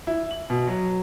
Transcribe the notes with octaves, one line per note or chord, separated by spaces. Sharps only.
E4
F#7
B2
F#3